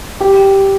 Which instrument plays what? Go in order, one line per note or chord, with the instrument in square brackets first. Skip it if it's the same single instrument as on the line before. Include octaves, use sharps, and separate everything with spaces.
[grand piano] G4